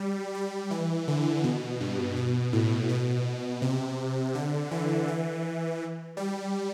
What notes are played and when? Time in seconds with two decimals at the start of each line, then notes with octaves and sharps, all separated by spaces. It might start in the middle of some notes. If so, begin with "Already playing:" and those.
Already playing: G3
0.34 G3
0.71 E3
1.08 D3
1.44 B2
1.80 G2
2.16 B2
2.53 A2
2.89 B2
3.62 C3
4.35 D3
4.71 E3
5.08 E3
6.17 G3